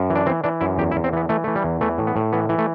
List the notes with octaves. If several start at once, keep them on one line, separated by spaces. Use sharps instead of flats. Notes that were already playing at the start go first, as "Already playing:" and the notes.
Already playing: F#2
E3
D4
E3 C4
E3 D4
F#2 E4
E2 G4
E4
E2
C4
E3 B3
E3 A3
E3 A3
G3
E2
E3 A3
A2
B3
A2
E3 B3
E3
A3